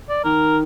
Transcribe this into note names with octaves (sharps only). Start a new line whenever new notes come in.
D5
D#3 A#4